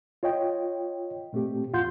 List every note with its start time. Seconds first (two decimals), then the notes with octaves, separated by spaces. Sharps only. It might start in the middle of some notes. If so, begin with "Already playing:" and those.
0.23 F4 C#5 D#5 G5
1.33 A#2 A3 C4 G4
1.73 E2 A2 F4 F#5 C6 G6